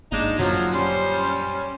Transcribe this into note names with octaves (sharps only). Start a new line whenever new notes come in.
G1 G#3 A#3 D4 D#4
F#2 A#2 D3 F3 F#3
G3 C#4 C5